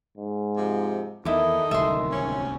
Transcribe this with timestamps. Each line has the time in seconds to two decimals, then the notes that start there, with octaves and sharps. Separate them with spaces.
0.17 G#2
0.56 C3 F3
1.25 E2 D#3 A#3 D#4 E4 A4 D6
1.71 D1 C2 E5 C6
2.11 C4 C#4 C#5